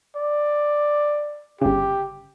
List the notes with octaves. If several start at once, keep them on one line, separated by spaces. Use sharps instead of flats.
D5
G1 C#3 G4